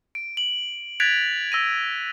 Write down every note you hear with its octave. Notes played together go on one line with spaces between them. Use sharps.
D7
F#7
F#6 G#6 A6 B6 D7 F7
E6 A#6 D#7